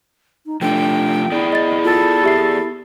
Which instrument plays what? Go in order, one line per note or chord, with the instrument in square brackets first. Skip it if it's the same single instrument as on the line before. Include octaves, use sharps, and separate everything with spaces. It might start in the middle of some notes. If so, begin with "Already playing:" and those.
[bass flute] D#4
[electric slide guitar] F3 A3 [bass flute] D4 [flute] G5
[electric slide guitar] B3 G#4 D5 [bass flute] E4
[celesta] D#5 A6
[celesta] F4 [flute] A4
[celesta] G4 E5 C7